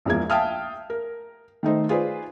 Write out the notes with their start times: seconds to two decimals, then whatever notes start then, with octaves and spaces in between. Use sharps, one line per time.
0.05 A#1 E2 F3 G#3 A#3 G#6
0.30 E5 F5 G5 A5 D#6 F6
0.90 A#4
1.63 D#3 A3 D#4 C5
1.89 F4 G#4 B4 C5 D5